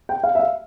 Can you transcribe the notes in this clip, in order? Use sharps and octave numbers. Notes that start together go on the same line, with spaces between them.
G5
F5
E5
F5